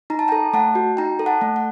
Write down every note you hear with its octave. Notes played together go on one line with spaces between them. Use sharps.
D#4 A#5
A5
A4 G5 A#5
A3 F#5 A5
F#4
D#4 G5 A#5
A4
F#5 A5
A3
F#5